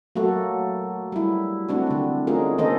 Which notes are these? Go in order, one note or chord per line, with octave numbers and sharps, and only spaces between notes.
F#3 A3 A#3 F#4 A4
G3 E4
A3 C4 D4 F#4
D3 A3
A3 C#4 D#4 F4 G#4 A#4
D#3 A#3 D#4 A4 C5 D#5